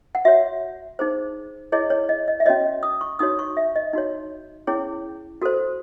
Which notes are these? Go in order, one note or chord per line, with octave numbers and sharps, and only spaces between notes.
F#5
F#4 C#5 E5
D#4 G#4 C5
E4 G#4 C#5 D#5
C#5
D#5
D#5
E5
C#4 F#4 C#5 D#5
D#6
C#6
D#4 F#4 C#5 D#6
C#6
E5
D#5
D#4 F#4 C#5
C#4 E4 G#4 C#5
F#4 A4 C5